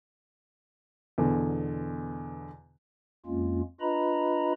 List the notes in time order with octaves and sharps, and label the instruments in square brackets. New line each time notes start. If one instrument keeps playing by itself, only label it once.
[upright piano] E2 B2 D3
[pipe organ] F2 G#3 A#3 C#4 F4
D4 F4 B4 D#5 A#5 B5